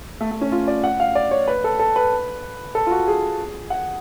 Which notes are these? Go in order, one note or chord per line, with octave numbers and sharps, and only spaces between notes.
A3
A3
C#4
F4
D5
F#5
F5
D5
C#5
B4
A4
A4
B4
A4
F4
F#4
G#4
F#5